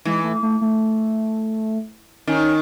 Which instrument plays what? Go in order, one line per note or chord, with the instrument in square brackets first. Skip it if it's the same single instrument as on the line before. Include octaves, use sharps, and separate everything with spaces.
[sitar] E3 [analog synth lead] G#3
[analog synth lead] A3
A3
A3
[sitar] D#3 [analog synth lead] C#4